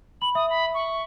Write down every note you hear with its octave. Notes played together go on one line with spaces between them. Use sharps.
B5 F#7
E5 D#6
B5
C#6